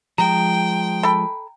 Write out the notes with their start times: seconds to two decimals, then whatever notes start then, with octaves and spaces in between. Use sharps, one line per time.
0.18 F3 G#3 G5 A#5
1.03 A4 B5